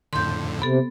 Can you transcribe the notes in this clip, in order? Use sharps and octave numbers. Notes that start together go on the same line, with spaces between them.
F2 A2 D3 C6 G6
C3 B3 A4